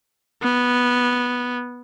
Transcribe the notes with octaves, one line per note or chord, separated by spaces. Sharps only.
B3